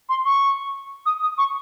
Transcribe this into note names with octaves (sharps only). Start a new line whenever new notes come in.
C6
C#6
D#6
D#6
C#6